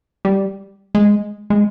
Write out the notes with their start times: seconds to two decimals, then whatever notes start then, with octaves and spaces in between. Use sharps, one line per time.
0.25 G3
0.95 G#3
1.50 G#3